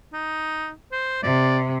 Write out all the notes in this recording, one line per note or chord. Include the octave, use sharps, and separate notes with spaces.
D#4
C5
C3 D5